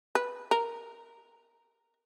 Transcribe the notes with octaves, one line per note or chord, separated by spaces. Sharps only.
B4
A#4